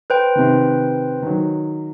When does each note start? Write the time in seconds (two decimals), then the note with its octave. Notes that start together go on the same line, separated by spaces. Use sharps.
0.10 B4 C5 G5
0.35 C3 D#3
1.22 D#3 F#3